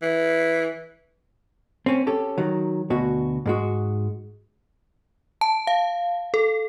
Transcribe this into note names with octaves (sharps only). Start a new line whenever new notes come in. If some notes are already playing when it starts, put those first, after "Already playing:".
E3
C4 C#4
C#4 G4 A4
D#3 F#3
D2 B2 F#4
G#2 G#3 F#4
A5
F5
A4